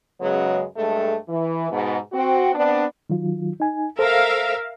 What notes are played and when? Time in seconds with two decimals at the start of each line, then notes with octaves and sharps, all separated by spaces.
0.21 F#2 C#3 F#3 G#3 B3
0.76 G2 G#3 A3 A4
1.28 E3
1.70 G#2 B2
2.12 C4 F#4
2.54 B3 C4 D4
3.10 D#3 F#3 F4
3.60 D#4 G#5
3.99 A4 A#4 C5 E5 F5